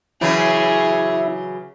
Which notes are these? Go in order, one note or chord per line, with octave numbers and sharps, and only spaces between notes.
C#3 E3 F#3 E4 G#4 C#5